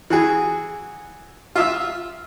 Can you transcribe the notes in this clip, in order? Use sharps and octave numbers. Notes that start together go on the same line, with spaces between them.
E3 F#4 G#4
F4 E5 E6